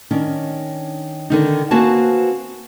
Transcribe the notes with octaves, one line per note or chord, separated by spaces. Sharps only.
D#3 C#4 D4
D3 D#3 D#4
A#3 C4 F#4 B4 G#5 A5